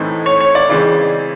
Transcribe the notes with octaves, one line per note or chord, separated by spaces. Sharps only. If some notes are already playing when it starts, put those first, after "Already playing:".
Already playing: A2 E3 A3 C4 D#4
C#5
C#5
D5
C#3 E3 G#3 C4 D5